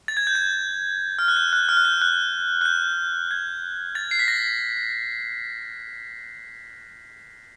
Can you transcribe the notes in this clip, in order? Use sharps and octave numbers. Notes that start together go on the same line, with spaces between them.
A6
G#6
G6
G#6
F6
F#6
G6
F#6
F6
F#6
G6
F#6
F#6
G6
G#6
A6
C7
B6
A#6